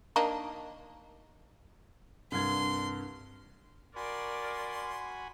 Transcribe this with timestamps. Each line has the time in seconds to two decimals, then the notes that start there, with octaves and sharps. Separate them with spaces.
0.16 A#3 D4 D#4
2.32 C2 G2 C6 G#6
3.96 F#4 A#4 D5 G#5 B5 C6